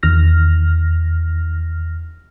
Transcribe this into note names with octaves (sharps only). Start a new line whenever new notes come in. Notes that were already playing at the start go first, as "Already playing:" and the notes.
E2 D#3 F6 A#6